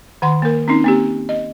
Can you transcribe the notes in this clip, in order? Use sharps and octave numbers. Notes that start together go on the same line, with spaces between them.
D#3 F#5 C6
A#3 A#4
C4 C#4 D#4
A#3 C4 G4
D#5